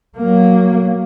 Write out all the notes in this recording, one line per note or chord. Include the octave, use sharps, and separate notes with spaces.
F#3 A#3